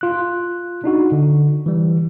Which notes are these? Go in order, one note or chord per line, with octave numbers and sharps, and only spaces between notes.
F4 F#6
D4 D#4 F#4
D3
E3 G3